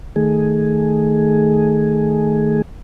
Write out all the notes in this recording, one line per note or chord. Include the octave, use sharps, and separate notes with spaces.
D#3 A3 G#4